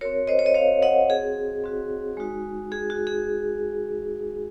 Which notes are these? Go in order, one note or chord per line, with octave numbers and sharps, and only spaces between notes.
C4 F#4 A#4 C#5
C5 D#5
C#5
D#5
C4 F#4 C#5 F5
D#5 F#5
C4 F#4 G#4
C4 F#4
G#3 D#4 F#4
G#3 D#4 F#4 G#4
F#4
G#4